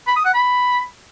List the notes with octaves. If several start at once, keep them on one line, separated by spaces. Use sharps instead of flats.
B5
D#6
F#5
B5